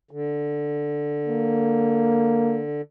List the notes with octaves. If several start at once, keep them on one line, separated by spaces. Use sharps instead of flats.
D3
A#3